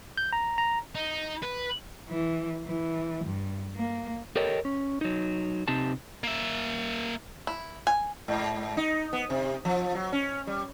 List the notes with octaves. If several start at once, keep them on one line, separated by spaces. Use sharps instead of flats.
G6
A#5
A#5
D#4
B4
E3
E3
G2
A#3
G4 A4 A#4 C#5 D#5 G5
C#4
F#3 D#4
C3 C4 D#4 G4 A5
A#3 E5
E4
G#5
G#2
D#4
B3
C3
F3
F#3
C#4
G3